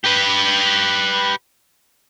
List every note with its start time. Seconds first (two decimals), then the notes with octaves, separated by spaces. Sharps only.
0.04 G4 B4